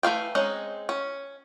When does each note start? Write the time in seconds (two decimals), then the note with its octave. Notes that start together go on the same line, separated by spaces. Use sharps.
0.03 E3 A3 F5 G5
0.35 G#3 C4 C#4 D#4
0.89 C#4